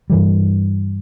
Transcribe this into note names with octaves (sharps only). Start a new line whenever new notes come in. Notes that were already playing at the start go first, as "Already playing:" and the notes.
G2 E3 G3